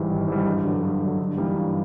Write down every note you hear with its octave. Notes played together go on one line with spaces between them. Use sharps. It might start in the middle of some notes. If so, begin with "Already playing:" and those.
Already playing: G#2 E3 G3
G#1
G#2 E3 G3
G2
D3 F#3
G2
D3 F#3
G2
E3 G3 A#3 D#4
G2